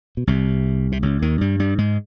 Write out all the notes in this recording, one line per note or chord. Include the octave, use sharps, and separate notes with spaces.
B2
C2 C3
C3
C#2 C#3
D#2 D#3
G2 G3
G2 G3
G#2 G#3